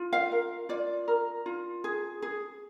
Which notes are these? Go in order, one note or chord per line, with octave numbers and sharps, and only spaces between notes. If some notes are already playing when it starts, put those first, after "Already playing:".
Already playing: F4
F5
A#4
F4 D5
A#4
F4
G#4
G#4